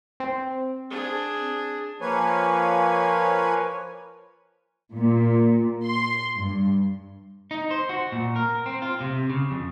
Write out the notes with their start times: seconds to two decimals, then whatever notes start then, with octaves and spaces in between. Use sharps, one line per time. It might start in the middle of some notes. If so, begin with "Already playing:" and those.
0.20 C4
0.90 D4 G#4
2.01 F3 A#3 B4 C#5 G#5
4.96 A#2
5.85 C6
6.38 G2
7.51 D#4
7.71 C5
7.89 F#4
8.12 A#2
8.36 A#4
8.66 C4
8.82 F4
9.01 C3
9.29 C#3
9.51 F2